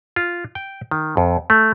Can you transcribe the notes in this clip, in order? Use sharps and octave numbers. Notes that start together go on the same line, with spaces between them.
F4
G5
D#3
F2
A3